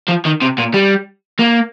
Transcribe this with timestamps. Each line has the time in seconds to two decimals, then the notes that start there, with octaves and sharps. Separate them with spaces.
0.09 F3
0.25 D#3
0.42 C3
0.58 A#2
0.74 G3
1.39 A#3